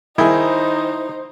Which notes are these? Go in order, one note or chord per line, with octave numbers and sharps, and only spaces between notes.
D#3 D#4 E4 G#4 C5